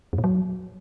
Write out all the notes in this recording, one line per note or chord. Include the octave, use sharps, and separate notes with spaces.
F2
A#2
F#3